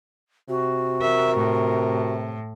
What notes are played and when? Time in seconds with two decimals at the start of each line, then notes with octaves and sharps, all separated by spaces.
0.49 C3 F#4
1.02 A#4 E5
1.36 A2